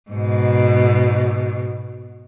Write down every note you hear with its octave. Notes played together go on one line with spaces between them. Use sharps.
G#2 B2